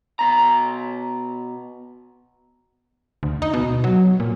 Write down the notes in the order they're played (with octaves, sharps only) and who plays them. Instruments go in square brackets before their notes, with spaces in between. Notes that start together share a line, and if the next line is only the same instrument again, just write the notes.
[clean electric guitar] B2 A#5
[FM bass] D2
D#4
B2
F#3
A#2